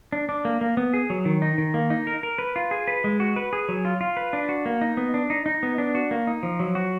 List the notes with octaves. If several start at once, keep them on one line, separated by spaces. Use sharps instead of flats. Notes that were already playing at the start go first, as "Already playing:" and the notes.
D4
D4
A#3
A#3
B3
G#4
F#3
D#3
D#4
D#3
A#3
D#4
A#4
A#4
B4
F4
G#4
B4
G#3
F#4
B4
G#4
F#3
F4
F4
B4
D4
F#4
A#3
D#4
B3
D4
D#4
D#4
B3
D4
F#4
A#3
D#4
F3
F#3
F#4